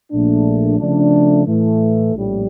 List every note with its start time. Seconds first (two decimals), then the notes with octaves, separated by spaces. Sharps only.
0.11 A#1 A#2 A3 D4
0.79 C#3 F3 A3 D4
1.46 A2 E3 A3
2.13 A#1 A2 G3